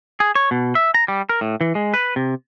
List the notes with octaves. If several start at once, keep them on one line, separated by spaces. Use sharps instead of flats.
G#4
C#5
B2
E5
A#5
G3
A#4
A2
E3
G#3
B4
C3